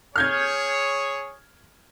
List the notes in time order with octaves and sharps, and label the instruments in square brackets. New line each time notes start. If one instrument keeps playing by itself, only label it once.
[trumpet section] G#4 C#5 [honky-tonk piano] F6 G6 G#6